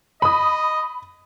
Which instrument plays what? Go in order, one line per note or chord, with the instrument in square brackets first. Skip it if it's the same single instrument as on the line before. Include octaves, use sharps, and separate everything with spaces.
[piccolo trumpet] D#5 [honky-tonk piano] B5 D#6